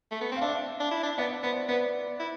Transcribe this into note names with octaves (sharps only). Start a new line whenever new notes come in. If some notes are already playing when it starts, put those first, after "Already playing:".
A3
B3
C4 F5
D4 E5
D4
E4
D4
B3 D5
B3 C5
B3 B4
E4